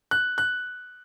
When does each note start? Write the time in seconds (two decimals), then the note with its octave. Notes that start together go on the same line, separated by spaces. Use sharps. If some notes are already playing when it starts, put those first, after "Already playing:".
0.11 F#6
0.38 F#6